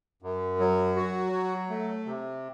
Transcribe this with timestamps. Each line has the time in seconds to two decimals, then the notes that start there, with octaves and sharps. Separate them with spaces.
0.22 F#2
0.60 F#3
0.96 F#4
1.33 F#3
1.70 A3
2.06 C3